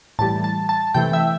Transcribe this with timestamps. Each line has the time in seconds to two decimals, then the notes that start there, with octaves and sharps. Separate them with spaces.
0.19 A2 E3 G3 A5
0.44 A5
0.69 A5
0.94 C3 E3 A3 G5
1.13 E5